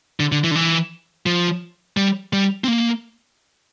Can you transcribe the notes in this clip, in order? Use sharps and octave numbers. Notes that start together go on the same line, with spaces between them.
D3
D3
E3
D3
E3
F3
G3
G3
C4
A#3